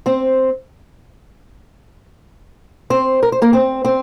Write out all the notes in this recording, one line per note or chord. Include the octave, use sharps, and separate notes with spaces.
C4 C5
C4 C5
A#4
C5
A#3 A#4
C4 C5
C4 C5